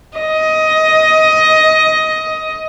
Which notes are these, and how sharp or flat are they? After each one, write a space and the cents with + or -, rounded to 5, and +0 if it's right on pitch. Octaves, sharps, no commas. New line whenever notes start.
D#5 +15